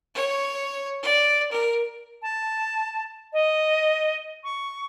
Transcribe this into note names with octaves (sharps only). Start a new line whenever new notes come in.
C#5
D5
A#4
A5
D#5
C#6